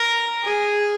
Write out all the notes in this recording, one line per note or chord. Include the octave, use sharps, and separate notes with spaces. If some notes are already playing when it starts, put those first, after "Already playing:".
Already playing: A#4
G#4